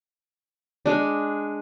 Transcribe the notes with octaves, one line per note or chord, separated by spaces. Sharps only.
G#3 D4